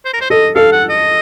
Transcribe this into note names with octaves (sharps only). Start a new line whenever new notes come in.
C5
A#4
C5
A4 D#5
A4 F5
F#5
D#5